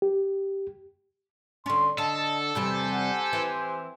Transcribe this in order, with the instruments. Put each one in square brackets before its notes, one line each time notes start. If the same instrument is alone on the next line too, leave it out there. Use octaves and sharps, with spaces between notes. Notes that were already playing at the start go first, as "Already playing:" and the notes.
[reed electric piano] G4
[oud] D3 C#4 [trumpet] C6
[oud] D3 [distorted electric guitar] A4 [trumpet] D#5 [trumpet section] A5
[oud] E2 C3 G3 [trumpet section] G4 C5 G#5 [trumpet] B5
[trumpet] F#5
[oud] E3 [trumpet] C4